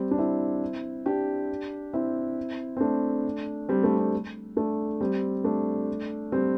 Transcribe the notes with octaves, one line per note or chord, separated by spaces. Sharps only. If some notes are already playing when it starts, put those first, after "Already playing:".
Already playing: G3 C4
D4
C4 E4
D4 G4
C4 E4
C4
A3 D4
G3 C4
A3 D4
G3 C4
A3 D4
G3 C4
A3 D4
G3 C4